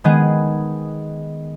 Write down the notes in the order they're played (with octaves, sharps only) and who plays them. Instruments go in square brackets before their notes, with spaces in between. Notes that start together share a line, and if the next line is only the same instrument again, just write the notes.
[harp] D#3 G#3 B3 G#4